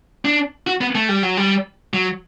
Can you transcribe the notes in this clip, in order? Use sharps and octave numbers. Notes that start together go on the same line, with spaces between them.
D4
F#4
B3
A3
G3
F#3
G3
F#3